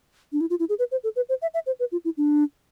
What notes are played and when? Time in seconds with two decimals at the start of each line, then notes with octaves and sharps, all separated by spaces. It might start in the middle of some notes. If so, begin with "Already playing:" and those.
0.33 D4
0.41 E4
0.50 F4
0.60 E4
0.69 G#4
0.79 B4
0.91 C5
1.04 A4
1.16 B4
1.29 C5
1.42 E5
1.54 E5
1.66 C5
1.80 B4
1.92 F4
2.05 E4
2.17 D4